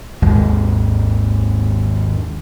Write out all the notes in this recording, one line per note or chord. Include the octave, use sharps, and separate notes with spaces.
G#1 D#2 G#3